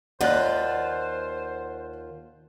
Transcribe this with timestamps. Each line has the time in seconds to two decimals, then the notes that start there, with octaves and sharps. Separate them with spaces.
0.21 D#2 F4 C5 D5 D#5 F#5 F#6